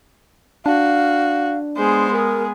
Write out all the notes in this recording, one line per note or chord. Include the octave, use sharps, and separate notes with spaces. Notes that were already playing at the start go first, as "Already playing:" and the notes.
D4 F#4 F5
G#3 B3 G#4 C5
G#4 A#4